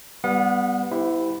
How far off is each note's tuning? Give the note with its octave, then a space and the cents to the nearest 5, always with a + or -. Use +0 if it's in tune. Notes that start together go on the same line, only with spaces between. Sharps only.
G3 +0 B3 +0 F#5 -40
E4 +0 G4 +0 C5 -45